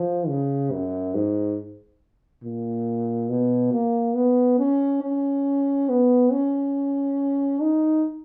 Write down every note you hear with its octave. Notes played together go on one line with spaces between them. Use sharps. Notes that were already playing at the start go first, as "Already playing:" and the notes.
Already playing: F3
C#3
F#2
G#2
A#2
B2
A#3
B3
C#4
C#4
B3
C#4
D#4